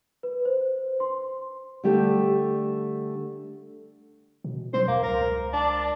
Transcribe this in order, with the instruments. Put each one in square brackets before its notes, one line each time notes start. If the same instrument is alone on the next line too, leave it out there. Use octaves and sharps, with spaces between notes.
[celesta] B4
C5
C6
[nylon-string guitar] D3 G3 A3 G4
[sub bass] B2
[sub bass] F#3 [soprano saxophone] C5
[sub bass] D#2 [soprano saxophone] A#3
[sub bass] C#2 [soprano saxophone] A#4
[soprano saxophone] D4